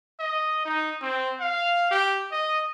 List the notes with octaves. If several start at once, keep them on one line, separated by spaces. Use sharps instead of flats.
D#5
D#4
C4
F5
G4
D#5